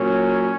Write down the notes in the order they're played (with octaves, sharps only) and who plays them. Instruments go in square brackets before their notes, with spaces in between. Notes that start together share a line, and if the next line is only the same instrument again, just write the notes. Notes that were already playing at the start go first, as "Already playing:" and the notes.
Already playing: [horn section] A#2 F#3 C#4